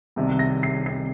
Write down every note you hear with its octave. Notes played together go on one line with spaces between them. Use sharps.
C2 C3 D#3
A#6
C7
C3 D#3 C7